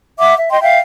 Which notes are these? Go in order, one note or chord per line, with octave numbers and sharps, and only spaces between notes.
E5 F#5 D6
E5
D#5 G5 C6
E5 F5 G5